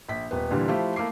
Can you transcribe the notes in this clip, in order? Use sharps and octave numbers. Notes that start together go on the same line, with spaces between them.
A#1 B6
D#1 B3
A#2 D3 E3 G3
F3 A3 E4 F4 G4 C5
A3 A#3 E4 D6 C7